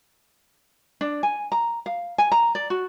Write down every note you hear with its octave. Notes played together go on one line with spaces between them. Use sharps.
D4
G#5
A#5
F5
G#5
A#5
D5
F#4